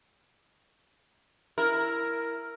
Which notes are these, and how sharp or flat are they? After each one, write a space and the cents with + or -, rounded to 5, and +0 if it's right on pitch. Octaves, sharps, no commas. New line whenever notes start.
E4 +10 A#4 +0